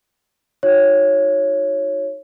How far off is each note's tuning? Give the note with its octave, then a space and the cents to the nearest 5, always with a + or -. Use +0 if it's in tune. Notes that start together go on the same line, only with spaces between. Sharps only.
D#4 +5 F#4 -30 C#5 -5